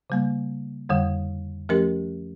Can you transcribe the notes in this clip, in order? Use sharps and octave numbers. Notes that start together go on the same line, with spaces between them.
C#3 G3 A#3
F2 D3 G3
F3 A3 C#4 G4 A#4